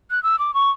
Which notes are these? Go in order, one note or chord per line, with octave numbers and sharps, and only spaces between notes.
F#6
E6
D6
C#6